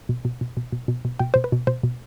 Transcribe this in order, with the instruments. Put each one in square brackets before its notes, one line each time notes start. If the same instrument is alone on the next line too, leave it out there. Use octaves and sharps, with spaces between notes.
[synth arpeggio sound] B2
B2
B2
B2
B2
B2
B2
B2 G5
B2 C5
B4
B2
B2 C5
B2